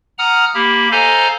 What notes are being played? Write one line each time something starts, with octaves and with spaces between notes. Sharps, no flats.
F#5 A#5 D#6 F6
A#3 G4 B5
A4 C5 D#5 F5 G#5 A#5